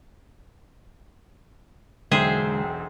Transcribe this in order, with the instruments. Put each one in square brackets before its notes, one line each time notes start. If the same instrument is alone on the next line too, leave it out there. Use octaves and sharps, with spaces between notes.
[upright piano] E1 B1 G5 [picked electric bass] D3 G#3 [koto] G#4 C5 E5